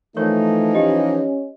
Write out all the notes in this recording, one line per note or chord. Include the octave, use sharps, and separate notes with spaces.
E3 F3 A3 D#4 A#4 C#5 C#6
C#4 G4 D#5